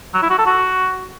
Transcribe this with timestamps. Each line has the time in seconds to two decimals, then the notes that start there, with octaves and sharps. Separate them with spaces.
0.14 F#3
0.22 E4
0.30 F#4
0.38 A4
0.46 F#4